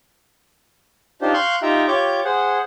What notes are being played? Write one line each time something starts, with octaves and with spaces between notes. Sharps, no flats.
D4 D#4 F4 G4 C5
F5 C6 C#6 F#6 G6
D#4 F4 G4 E5 G5 A#5
F4 G4 C#5 C#6 D6 G6
G#4 C5 F#5